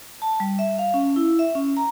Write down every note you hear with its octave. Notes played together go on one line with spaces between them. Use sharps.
A5
G3
E5
F5
C#4
E4
E5
C#4
A#5